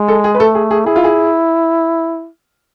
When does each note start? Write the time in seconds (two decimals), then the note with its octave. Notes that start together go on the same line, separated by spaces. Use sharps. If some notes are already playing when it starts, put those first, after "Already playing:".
Already playing: G#3
0.08 A4
0.24 G#4
0.35 B4
0.39 A3 A4
0.55 G#4
0.71 G#4
0.86 E4 G#4
0.96 F4
1.04 G#4